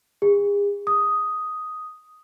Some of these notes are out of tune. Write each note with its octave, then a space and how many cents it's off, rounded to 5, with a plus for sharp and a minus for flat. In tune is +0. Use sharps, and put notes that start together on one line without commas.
G#4 -40
D#6 +5